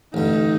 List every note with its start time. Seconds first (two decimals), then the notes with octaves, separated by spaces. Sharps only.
0.14 A1 G2 D3 D#4